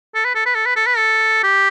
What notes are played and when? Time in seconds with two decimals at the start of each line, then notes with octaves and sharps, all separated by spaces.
0.15 A4
0.25 B4
0.35 A4
0.46 B4
0.55 A4
0.66 B4
0.76 A4
0.87 B4
0.97 A4
1.43 G4